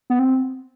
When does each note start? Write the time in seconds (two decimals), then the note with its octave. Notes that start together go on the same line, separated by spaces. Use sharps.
0.10 B3
0.19 C4